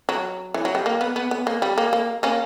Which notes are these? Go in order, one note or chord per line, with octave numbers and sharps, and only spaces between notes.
F#3
E3
F#3
G3
A#3
B3
B3
B3
A#3
G3
A#3
A#3
A#3 C#4